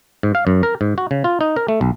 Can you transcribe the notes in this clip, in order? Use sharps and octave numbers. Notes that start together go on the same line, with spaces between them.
G#2
F5
F#2
A#4
G#2
F#4
C#3
F4
D#4
A#4
A3
B1